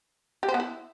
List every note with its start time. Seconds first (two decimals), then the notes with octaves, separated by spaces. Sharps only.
0.43 G4
0.49 C5
0.54 B3
0.60 E4